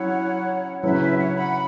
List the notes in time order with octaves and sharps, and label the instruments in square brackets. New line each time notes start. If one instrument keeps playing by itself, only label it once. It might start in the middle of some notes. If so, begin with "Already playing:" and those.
Already playing: [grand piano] F#3 C#4 E4 [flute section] C#5 F#5
[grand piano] C#3 F#3 C#4 E4 [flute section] B4 E5
[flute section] B4 E5
C#5 F#5
F#5 B5